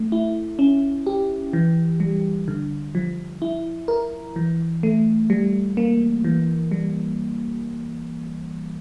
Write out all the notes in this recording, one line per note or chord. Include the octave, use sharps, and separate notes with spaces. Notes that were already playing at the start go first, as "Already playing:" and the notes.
Already playing: A3
E4
C#4
G4
E3
G3
D3
F3
E4
A#4
E3
A3
G3
A#3
E3
G3